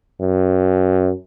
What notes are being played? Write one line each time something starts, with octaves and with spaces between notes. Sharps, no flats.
F#2